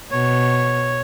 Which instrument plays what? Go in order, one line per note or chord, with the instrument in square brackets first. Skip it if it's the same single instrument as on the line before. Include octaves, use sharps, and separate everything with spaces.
[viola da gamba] B2 [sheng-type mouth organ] C#5